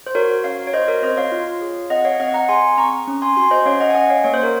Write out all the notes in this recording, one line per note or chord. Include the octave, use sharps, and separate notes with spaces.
C5
F#4 A#4 C#5
C#4 C#5 F5
C#5
F#4 C5 D#5
A#4 C#5
C4 C5 D#5
C#5 F5
F4
G#4
C4 D#5 F#5
C#5 F5
C4 D#5 F#5
F#5 A#5
G#4 G#5 C6
C4 A#5 C#6
C#4
G#5 C6
F#4 G#5 C6
C5 D#5
C#4 C#5 F5
D#5 F#5
G#5
C#4 D#5 F#5
C#5 F5
A#3 C#5
C5
A#4 C#5